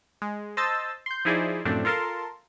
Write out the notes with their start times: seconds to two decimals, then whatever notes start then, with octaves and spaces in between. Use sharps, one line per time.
0.22 G#3
0.57 C5 D#5 A5 E6 A6
1.06 C6 G6
1.25 F3 D#4 E4 G#4 C5 D5
1.65 F#2 A2 F3 A3 C4 D4
1.85 F4 A4 A#4 A5 C6